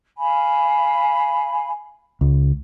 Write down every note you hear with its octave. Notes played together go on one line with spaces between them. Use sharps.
F5 G#5 B5
C#2